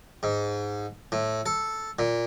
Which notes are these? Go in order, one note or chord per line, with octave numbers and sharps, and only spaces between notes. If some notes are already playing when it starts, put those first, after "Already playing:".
G#2
A2
A4
A#2